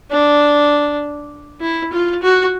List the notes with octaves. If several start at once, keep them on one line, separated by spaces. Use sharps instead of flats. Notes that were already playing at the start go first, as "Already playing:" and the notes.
D4
E4
F4
F#4